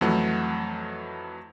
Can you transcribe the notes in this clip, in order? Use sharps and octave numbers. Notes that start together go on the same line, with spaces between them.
F2 E3 F#3 A3 F#5